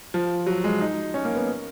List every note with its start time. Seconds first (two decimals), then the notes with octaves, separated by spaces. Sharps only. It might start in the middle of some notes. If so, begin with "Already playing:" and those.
0.14 F3
0.46 F#3
0.64 G#3
0.81 D#4
1.14 C#4
1.25 A#3
1.36 B3